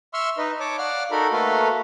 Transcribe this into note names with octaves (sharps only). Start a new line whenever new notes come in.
E5 C6 C#6 E6 F6
D#4 B4 D#5
C#5 A5 D6
D5 F5 F#5 F6
D#4 F#4 A4 A#4 B5
A3 A#3 F#4 A4 B4 F5